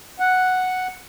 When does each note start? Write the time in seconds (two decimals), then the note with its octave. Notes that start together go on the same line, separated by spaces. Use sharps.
0.20 F#5